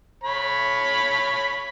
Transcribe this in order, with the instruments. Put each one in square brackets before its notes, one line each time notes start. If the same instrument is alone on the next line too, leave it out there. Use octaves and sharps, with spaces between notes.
[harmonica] C#5 B5